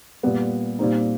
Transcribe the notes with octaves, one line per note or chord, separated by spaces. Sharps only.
A#2 G3 B3
A#2 G3 C4 D#4